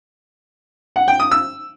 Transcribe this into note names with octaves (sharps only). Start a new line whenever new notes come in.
F#5
G5
D#6
E6